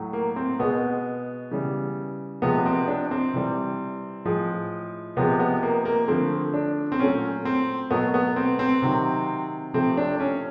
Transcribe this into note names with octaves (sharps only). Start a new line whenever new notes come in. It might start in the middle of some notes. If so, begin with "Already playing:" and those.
Already playing: A2 F#3 A3
A#3
C4
B2 G#3 B3
C#3 E3 G3
C3 F3 G#3 B3
B3
C4
D4
C4
C3 E3 G3
A2 F3 G#3
C3 F3 G#3 B3
B3
A#3
A#3
D3 F3 A3 C4
D4
C4
A#2 F#3 A3 C#4
C4
B2 F#3 A3 B3
B3
C4
C4
C3 D#3 F#3
C3 F3 A3 C4
D4
C#4